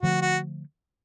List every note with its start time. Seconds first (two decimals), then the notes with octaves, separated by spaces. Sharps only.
0.02 D3 F3 A3 F#4
0.22 F#4